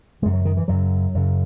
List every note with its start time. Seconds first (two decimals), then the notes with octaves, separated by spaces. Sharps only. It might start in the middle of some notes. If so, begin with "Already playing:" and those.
0.22 F#2 C#3 G#3
0.33 F#3
0.45 D#3
0.57 E3
0.68 F#2 C#3 F#3
1.15 F#2 C#3